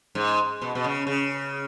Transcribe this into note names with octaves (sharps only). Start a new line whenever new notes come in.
G#2
B2
B2
C#3
C#3